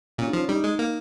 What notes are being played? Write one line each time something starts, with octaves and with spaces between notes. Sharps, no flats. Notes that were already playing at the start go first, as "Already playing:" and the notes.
A#2 C#4
D#4
F3 C#4
G3 D#4
G#3
A#3